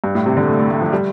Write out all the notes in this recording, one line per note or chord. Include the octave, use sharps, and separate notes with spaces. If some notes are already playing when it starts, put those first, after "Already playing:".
G2
A2
C3
D3
A3
A3
A3
F3
G3